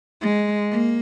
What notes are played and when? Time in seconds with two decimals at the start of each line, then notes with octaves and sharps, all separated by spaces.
0.21 G#3
0.71 A#3